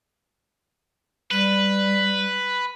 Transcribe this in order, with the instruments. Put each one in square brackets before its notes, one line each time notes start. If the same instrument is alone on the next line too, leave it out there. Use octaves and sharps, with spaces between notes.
[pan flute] G3 [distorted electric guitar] B4